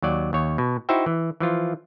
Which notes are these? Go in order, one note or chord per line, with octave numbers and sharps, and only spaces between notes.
D#2 F#3 D5
D#2 C#5
B2
D#4 E4 F#4 C5 E5 G5
E3
E3 F3 F4